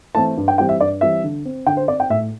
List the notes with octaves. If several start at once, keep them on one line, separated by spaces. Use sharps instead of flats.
E3 A3 C4 A5
G2
G5
E3 G3 C4 G5
E5
G2 D5
E3 G3 C4 E5
D3
C4
D3 G5
C5
C4 D5
G5
A2 E5